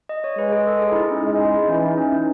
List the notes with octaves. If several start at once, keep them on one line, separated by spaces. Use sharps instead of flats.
D#5
C#5
G#3 B4
G#4
A4
G#4
E4
D#4
C#4
G#3
D#4
E3 C#4
D#4
C#4
C#4